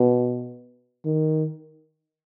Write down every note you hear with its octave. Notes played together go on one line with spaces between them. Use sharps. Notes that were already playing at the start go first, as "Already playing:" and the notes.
Already playing: B2
D#3